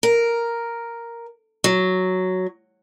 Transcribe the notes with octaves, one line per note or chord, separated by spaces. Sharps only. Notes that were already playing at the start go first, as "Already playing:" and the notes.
A#4
F#3